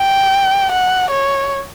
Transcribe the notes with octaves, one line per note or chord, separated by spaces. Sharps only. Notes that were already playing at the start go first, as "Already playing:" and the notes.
Already playing: G5
F#5
C#5